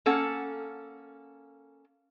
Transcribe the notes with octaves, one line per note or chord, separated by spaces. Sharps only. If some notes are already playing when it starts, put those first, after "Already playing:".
A#3 C#4 A4 F#5